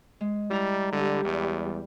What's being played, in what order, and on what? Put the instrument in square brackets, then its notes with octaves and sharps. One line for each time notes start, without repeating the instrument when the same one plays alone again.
[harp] G#3
[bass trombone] G3 [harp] E4 A#5
[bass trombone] D3 [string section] G3
[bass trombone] E2